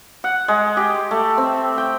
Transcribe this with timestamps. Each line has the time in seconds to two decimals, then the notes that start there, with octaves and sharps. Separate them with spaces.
0.24 F#5
0.48 G#3
0.77 G4
1.11 A3
1.38 C4
1.78 G5